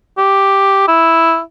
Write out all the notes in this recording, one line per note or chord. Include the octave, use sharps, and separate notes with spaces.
G4
E4